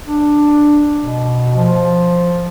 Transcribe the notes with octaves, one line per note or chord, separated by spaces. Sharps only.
D4
B2
F3